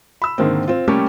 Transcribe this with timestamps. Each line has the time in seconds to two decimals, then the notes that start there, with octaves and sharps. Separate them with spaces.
0.22 B5 E6
0.38 G#2 D3 D#3 A#3 C4
0.68 C4 F4
0.88 G3 A3 A#3 C#4 G4